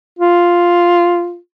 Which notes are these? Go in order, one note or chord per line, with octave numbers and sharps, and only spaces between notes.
F4